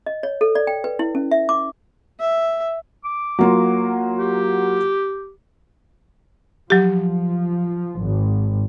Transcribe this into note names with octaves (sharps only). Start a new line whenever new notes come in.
D#5
C#5
A4
D5
G5
B4
E4
C#4
E5
D6
E5
D6
F#3 A#3 F4
G4
F3 F#3 G4
G#1